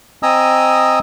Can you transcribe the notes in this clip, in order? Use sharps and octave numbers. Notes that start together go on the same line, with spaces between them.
C4 D#5 G#5 A#5 D#6 E6